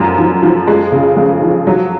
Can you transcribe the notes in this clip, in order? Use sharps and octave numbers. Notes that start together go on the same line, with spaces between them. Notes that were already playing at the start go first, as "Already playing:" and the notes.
Already playing: F#2 F3
F3
F3
G#3
C#3
F2
F3
F#3